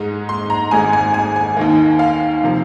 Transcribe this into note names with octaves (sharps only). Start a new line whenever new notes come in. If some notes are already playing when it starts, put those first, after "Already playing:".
Already playing: G#2 G#3 D#4
C6
A#5
G#1 G#2 G#3 G#5
G#5
G#5
G#5
D#2 D#3 A#3
F5
C3 F3 A#3